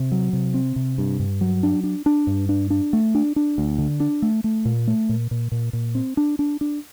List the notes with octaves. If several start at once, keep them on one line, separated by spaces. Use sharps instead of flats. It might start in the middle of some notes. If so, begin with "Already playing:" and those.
Already playing: C3
F#3
C3
C4
C3
G2
G2
F#3
D4
D4
D4
G2
D4
D4
A3
D4
D4
D2
D3
D4
A3
A3
A#2
A3
A#2
A#2
A#2
A#2
C4
D4
D4
D4